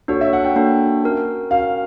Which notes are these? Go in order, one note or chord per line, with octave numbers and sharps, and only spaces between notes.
A#3 D4 F#4 A4 C#5
E5
F#5
G5
A#3 D4 F#4 A4
C#4 F#4 A#4
C#4 F#4 A#4 F5